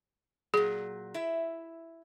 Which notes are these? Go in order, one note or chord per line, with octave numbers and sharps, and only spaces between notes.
A#2 F#3 G#4
E4 E5